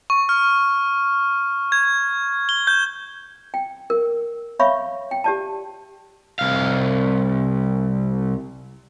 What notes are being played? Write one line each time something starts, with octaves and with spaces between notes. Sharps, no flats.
C#6
F6
G#6
G7
G6
G5
A#4
C#5 E5 F5 B5 C#6
G5
G4 D5 A5
C2 F5